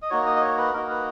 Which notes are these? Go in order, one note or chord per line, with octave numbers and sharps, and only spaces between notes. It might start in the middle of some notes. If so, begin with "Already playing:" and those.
D#5
A#3 D#4 F#4 C#5
D#5
D#5
C#5
B4
A#3 D#4 F#4 A#4
B4